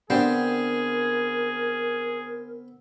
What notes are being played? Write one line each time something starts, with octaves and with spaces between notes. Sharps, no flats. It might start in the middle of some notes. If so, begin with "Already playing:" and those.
D3 B3 C4 G4 G#4 A#4 C5